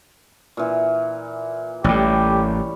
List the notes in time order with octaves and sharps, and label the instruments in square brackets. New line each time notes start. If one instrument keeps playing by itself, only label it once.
[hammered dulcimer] A#2 E3
[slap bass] A1 A2 [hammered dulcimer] G3 C#5 [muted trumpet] G4